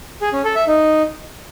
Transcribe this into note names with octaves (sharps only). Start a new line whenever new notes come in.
G#4
C#4
A4
E5
D#4